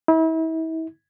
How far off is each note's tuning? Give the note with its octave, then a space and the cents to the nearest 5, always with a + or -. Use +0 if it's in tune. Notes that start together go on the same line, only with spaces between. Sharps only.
E4 -40